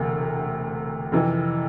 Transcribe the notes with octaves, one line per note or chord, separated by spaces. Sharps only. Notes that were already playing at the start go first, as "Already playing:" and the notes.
Already playing: E1 D2 C3
F2 C3 E3